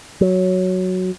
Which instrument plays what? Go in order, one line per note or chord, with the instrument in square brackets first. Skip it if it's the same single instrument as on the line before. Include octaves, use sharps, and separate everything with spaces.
[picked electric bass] F#3